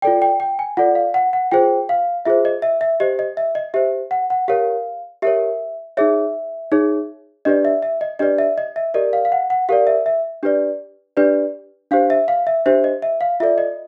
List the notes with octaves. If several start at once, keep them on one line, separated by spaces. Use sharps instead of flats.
F4 A4 D5 G5
G5
G5
G#5
F4 A4 D5 F#5
F5
F#5
F#5
F4 G#4 C5 G5
F5
F4 G#4 C5 E5
D#5
E5
E5
G4 C5 D#5
D#5
E5
D#5
G4 C5 E5
F#5
F#5
G4 A#4 C#5 F5
G4 A#4 C#5 E5
D#4 G#4 C#5 E5
D#4 G#4 C#5
D4 G4 B4 D5 D#5
E5
E5
D#5
D4 G4 B4 D5 D#5
E5
D#5
E5
G4 A#4 D5 D#5
F5
F5
F#5
F#5
G4 A#4 D5 F5
E5
E5
D4 G4 B4 D5
D4 G4 B4 D5
D4 G4 C5 F5
E5
F5
E5
D4 G4 C5 E5
D#5
E5
F5
F4 A4 D5 E5
D#5